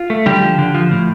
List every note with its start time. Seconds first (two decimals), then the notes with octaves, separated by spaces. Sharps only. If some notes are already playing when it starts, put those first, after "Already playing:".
Already playing: F4
0.10 A3
0.26 D3 G3 G4
0.42 F3
0.59 D3
0.75 F3
0.91 A2